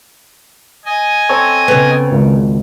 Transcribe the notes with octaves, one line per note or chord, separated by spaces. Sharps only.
D#5 G#5
C4 A4 C#5
C#3 B3
G#1 C#2